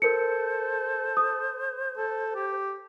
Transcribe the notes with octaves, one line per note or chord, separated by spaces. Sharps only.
A4 A#4 C5 C#7
D#6
A4
G4